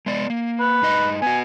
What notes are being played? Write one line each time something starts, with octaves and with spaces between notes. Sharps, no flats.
G#3 B3 D5
A#3
B4
G2 D#4 D#5
B3 F#4 G#5